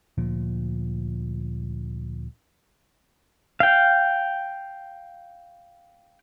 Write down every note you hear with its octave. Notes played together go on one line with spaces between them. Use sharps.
D2 A#2 F3
F5 G5